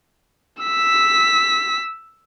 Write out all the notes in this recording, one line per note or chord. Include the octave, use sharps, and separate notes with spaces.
E6 B6